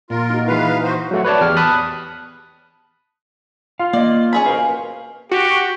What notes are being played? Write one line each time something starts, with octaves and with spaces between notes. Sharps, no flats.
A#2 F4 A#4
D#4 F#4
E3 G#3 D#4 E4 B4 F5
F#4 C5
F#3 A3 F#4
B4 C#5 D5 A5
E2 G4 F6
A5 B5 D#6 F#6
F4 F5
A#3 D5 D#5
C#4 G#4 B5
B2 A#4 C5 F5
F#4 G4